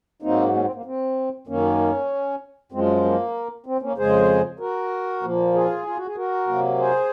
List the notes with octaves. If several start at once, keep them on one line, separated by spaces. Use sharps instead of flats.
G#2 F#3 A#3 C4 D#4
A#3 C#4
C4
A#3
C4
F#2 D#3 A#3 C#4
F#2 F3 G#3 C4
A#3
C4
A#3 C#4
F2 C#3 G#3 G#4 C5
F#4 A#4
A#2 F3 A#3
F4 G#4
F4
F#4
G#4
F#4 A#4
C3 F#3 A#3
G#4 C5